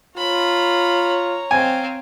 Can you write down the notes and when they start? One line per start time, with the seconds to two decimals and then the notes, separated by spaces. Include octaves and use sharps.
0.18 F4 C#5 A#5 B5
1.51 C4 F5 G#5